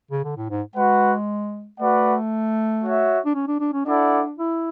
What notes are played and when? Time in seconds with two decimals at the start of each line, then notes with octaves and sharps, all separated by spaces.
0.12 C#3
0.24 D3
0.37 A2
0.50 G#2
0.76 G#3 F#4 B4 F#5
1.80 A3 F#4 B4 D5 F#5
2.83 F#4 C#5 E5
3.25 D4
3.35 C#4
3.47 D4
3.60 D4
3.73 C#4
3.86 D4 E4 A4 D5 F#5
4.38 E4